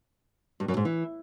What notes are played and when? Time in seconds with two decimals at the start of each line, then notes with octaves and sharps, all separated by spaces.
0.60 G2
0.68 F#2
0.77 G#2
0.85 E3